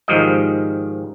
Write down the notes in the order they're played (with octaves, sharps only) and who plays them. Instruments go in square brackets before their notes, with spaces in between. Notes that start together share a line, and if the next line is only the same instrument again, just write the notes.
[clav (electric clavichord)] G#2 D#3 F3 G3 D#5